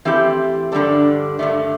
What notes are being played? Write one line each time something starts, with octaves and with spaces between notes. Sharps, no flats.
E3 A3 C4 E4 G4
G2 D3 G3 D4 A4
G2 D3 A3